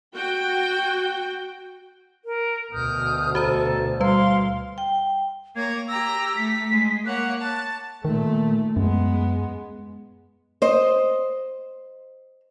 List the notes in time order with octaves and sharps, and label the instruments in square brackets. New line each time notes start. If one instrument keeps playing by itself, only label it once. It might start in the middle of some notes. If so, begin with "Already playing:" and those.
[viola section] F#4 G5
[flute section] A#4
[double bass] D2 B2 [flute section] D#6 F6 G6
[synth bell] F#4 C5 A#5 [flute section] A4
[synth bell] G3 B4 [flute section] F5 C6
[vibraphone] G5
[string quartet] A#3 C#5 A#5 [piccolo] G#6
[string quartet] G4 A#5 A#6 [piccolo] E6
[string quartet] A3 [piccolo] B6
[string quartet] G#3
[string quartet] A#3 C#5 F#5 [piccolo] F#6
[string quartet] A5
[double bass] A#2 A3 [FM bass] D#3
[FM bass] F#2 [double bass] G#3 B3
[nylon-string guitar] C5 D#5